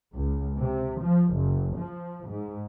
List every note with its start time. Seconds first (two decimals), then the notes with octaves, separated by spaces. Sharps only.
0.13 C#2
0.58 C3
1.02 F3
1.34 F#1
1.78 F3
2.29 G#2